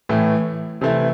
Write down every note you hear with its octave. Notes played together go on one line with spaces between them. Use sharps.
A2 E3 A3
C3 E3 A3 E4